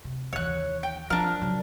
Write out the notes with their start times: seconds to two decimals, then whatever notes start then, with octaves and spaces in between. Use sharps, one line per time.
0.04 C3
0.33 D#2 E3 C#5 F#6
0.83 G5
1.10 F3 D4 A#4
1.41 C#3 F#3